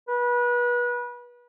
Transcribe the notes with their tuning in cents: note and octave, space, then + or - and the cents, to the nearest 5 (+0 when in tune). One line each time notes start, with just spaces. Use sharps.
B4 -30